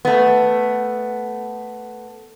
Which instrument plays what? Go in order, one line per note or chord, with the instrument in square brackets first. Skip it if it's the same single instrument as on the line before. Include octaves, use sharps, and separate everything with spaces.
[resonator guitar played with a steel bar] A3 B3